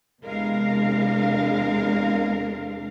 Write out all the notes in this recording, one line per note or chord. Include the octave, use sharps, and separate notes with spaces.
E2 C3 G#3 D4 A#4 F5